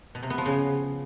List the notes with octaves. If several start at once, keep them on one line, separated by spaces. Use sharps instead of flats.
B2
C3
B3
F3
C#3